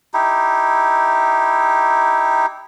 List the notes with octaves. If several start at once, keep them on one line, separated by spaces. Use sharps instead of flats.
D#4 E4 G4